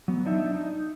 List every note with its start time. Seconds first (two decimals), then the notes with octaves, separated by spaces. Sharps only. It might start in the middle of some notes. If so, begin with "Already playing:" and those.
0.08 F#3 B3
0.26 D4 D#4 E5
0.54 D#4